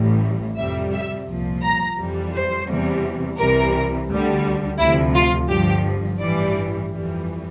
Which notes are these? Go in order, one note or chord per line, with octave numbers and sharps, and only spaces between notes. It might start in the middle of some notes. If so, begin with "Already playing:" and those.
Already playing: A1 A2 E3 G3
F2 C3 G3 E5
E5
C2 A#2 F3
A#5
F2 E3 G3
C5
E2 C3 E3 G3
C2 C3 E3 G3 A#4
D2 D3 G3
D2 C3 F3 E4
F4
G1 G2 D3 F3 G4
A1 G2 E3 G3 D5
F2 E3 G3